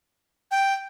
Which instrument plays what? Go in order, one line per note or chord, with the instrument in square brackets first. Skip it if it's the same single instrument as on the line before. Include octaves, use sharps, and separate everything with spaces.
[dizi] G5